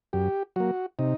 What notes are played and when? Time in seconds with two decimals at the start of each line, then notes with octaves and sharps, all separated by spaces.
0.13 F#2 G4
0.56 F#3 A#3 F#4
0.99 C3 D#4